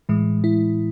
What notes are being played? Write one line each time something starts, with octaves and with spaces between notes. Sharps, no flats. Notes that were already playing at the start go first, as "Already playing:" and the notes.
A2 E3 G#3
E4